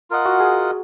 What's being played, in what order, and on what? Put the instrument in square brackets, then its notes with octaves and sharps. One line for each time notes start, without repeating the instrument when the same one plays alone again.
[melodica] F4 A#4 D#5 F#5
[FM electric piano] F#4
G#4